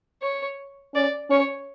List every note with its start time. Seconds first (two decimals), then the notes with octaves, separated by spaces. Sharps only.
0.22 C#5
0.94 C#4 D5
1.30 C#4 C#5